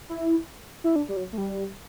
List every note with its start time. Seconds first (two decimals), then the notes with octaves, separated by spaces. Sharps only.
0.09 E4
0.84 E4
0.96 D4
1.09 G3
1.17 F#3
1.33 A3
1.38 G3